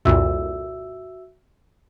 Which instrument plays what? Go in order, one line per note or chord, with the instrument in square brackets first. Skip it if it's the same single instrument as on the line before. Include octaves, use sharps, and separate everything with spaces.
[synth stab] C2 F2 A#2 [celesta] F#4 E5 E6